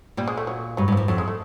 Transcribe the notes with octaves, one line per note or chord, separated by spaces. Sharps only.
A#2 G3
G#3
A3
F#3
G2 F#3
G2
F#2 F3
F2 F#3
G#3
A3